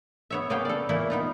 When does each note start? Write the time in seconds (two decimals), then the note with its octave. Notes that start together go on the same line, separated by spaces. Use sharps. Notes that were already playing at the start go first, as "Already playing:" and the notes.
0.30 B3 C#5 E5
0.50 C#3 A#3 B3 F5 G5
0.65 A4 D5
0.89 A#2 E3 A3 A#3 E4
1.10 B3 D#4 F4